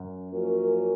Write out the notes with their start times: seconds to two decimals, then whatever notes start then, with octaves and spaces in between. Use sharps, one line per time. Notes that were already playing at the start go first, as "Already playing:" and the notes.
Already playing: F#2
0.31 F3 A#3 C#4 F#4 A#4